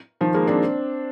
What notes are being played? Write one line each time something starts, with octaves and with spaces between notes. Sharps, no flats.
D#3 F3
G#3 A#3
C4 D4